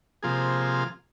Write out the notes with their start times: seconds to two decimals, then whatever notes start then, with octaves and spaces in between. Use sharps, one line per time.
0.23 C3 F3 A#3 F4 G#4